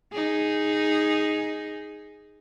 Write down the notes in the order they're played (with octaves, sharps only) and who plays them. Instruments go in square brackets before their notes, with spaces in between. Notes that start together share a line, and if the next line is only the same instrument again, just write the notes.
[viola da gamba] D#4 G#4